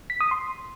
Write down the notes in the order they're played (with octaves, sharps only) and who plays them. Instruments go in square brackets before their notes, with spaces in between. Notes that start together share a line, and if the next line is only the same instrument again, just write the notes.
[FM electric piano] B6
D#6
C6